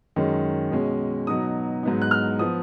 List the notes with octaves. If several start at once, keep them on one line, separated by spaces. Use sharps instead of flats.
F#2 D#3 G#3 C#4
B2 G#3 C#4
B2 F#3 B3 D#4 D#6
G#2 F#3 B3 D#4
F#6
F6
F3 B3 D#6